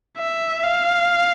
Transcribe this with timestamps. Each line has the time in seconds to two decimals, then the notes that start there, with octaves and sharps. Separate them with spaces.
0.19 E5
0.63 F5